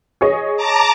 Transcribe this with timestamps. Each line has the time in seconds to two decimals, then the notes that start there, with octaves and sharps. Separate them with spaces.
0.21 G#4 C#5 D#5
0.57 A5 A#5 D6